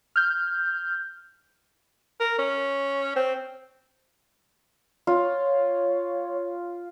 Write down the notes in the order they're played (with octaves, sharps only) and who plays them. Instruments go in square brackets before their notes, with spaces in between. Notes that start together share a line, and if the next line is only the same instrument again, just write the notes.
[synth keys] F6 G6
[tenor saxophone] A#4
C#4
C4
[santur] F4 [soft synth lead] C#5